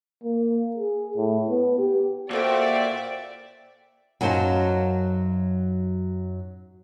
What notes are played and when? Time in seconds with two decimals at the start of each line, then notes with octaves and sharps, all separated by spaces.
0.24 A#3
0.76 G#4
1.16 A2
1.50 B3
1.78 G4
2.31 A#2 F#4 A4 C5 D5 E5 G5
4.21 F#2 F#3 D#4 C5 F5 A5